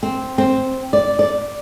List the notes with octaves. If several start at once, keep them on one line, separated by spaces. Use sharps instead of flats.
C4
C4
D5
D5